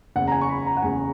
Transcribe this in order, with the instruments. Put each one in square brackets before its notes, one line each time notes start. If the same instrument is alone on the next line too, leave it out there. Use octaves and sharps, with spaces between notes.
[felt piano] F#1 E2 C#3 [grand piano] F#5
[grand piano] A#5
G#5
C#6
B5
A#5
F#5
[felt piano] F#1 E2 C#3 [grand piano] G#5